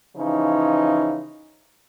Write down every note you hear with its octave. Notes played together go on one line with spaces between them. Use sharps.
C#3 E3 F3 C#4 D#4